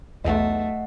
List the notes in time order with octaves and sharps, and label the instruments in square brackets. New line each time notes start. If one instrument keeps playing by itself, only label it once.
[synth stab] B1 E2 [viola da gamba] A3 [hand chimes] D#5 F#5